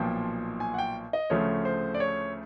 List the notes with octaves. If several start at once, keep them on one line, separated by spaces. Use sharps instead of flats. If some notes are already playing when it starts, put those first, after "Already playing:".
Already playing: B1 A#2 F3 G5
G#5
F#5
G5
D#5
D2 C#3 F3 A3 C#5
C5
D5
C#5